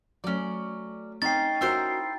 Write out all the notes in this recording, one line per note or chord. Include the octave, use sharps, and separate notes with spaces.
F#3 A3 C#4 D5
C4 C#4 D#4 G5 A6 C7
C#4 E4 F#4 A#4 C5 F6